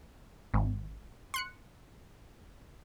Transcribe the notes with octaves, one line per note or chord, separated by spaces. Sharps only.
G#1
C6 F#6 C#7